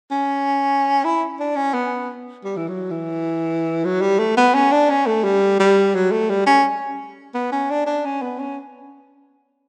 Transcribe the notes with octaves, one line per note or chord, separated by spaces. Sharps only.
C#4
E4
D4
C#4
B3
G3
E3
F#3
E3
F#3
G3
A3
B3
C#4
D4
C#4
A3
G3
G3
F#3
A3
G3
C#4
B3
C#4
D4
D4
C#4
B3
C#4